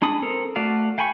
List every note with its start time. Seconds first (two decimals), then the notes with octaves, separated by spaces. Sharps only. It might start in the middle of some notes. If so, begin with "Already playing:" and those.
0.02 G#3 D4 B5 D#6
0.22 C4 A4 A#4
0.56 A3 F#4 D5 F5
0.98 F5 G5 G#5 B5 C#6